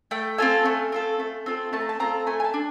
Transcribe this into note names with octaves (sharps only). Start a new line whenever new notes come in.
A3 G5
C4 F4 A4 G#5
A3
C4 F4 A4
A3
C4 F4 A4
A3 A5
A#5
A5
C4 F4 A4 A#5
A3 G#5
G#5
A5
D4